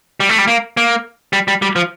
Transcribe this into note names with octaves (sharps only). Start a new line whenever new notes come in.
G3
A3
G3
A#3
A#3
G3
G3
G3
F3